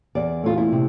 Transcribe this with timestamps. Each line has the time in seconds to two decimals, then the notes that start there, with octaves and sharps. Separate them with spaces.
0.15 E2 D5
0.44 A3 F4
0.58 E4
0.72 C3